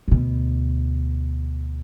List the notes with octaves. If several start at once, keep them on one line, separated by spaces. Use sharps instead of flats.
D2 B2